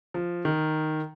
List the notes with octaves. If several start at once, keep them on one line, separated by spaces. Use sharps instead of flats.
F3
D#3